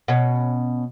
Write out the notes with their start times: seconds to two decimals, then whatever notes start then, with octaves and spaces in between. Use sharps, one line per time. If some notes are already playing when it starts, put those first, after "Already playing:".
0.08 B2 C#4